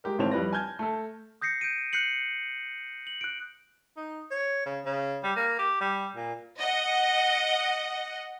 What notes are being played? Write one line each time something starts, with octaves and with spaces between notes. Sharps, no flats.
G#3 G4 A#4
G#1 E3 A3 C4 C#5 F7
F2 G3 E4 B4 C#5 A#6
G#5 A5 F6 G6 G#6
A3 A4
D#6 G6 A#6 C7 C#7
G6 D7 D#7
F#6 G6 C7 C#7 F#7
F#7
F#6 D7
D#4
C#5
C#3
C#3
G3
A#3
G4
G3
A#2
D#5 F#5